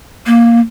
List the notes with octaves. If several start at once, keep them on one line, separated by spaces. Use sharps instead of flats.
A#3